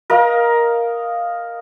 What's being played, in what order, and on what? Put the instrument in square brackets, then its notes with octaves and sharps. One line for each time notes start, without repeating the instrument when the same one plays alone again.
[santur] A#4 D#5 F5